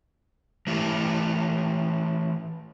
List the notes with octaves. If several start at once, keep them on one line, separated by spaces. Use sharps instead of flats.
E3 A3 E4 G4